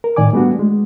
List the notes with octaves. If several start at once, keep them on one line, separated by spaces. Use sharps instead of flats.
A#4
A2 D#3 D5 G#5 D6
G3 A3 B3 D4 F#4
G#3